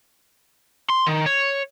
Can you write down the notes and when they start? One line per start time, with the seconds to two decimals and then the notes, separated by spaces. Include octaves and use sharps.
0.90 C6
1.07 D#3
1.26 C#5